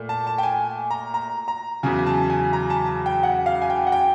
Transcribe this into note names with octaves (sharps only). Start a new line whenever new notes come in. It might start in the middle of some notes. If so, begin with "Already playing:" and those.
Already playing: A#2 A3
A5
A5
G5
G#5
A#5
A#5
A#5
E2 C#3 F#3 G#5
G#5
A5
G#5
A#5
A5
G5
F#5
F5
G#5
G5
F#5
G5